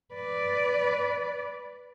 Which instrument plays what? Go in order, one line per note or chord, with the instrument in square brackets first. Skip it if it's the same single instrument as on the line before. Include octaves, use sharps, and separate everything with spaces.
[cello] B4 D5